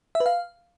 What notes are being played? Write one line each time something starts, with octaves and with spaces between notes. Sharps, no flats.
E5
B4
F5